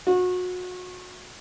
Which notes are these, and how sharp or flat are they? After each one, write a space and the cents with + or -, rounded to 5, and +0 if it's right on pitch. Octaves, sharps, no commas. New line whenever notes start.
F#4 -30